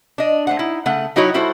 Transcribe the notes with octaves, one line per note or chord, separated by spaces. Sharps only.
D4 D#5
A3 C5 F#5
D#4 E4
C#3 A3 F#5
F#3 D#4 E4 F#4 G4 C#5
G3 E4 F#4 A4 C5